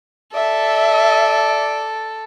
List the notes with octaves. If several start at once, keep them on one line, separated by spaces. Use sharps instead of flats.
A4 D5 E5